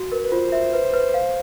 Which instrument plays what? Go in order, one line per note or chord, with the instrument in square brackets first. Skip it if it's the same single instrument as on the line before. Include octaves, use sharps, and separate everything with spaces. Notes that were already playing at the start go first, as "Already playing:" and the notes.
Already playing: [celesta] F#4
[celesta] A#4 [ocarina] B4
[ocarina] B4
[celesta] F4 [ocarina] C5
[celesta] E5
B4
B4
F5